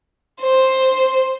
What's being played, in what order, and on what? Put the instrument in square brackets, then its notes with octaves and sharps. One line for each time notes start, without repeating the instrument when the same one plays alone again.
[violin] C5